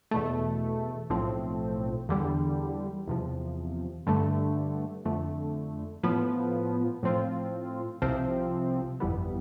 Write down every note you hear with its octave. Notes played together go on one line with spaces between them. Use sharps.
E2 B2 A3
B1 A2 F3 A3 C4
E2 D3 G3
E2 C3 F3
G2 D3 A3
F2 D3 A3
A2 F3 B3
A2 F3 C4 F4
C2 C3 F3 C4
G1 F2 E3 G3 B3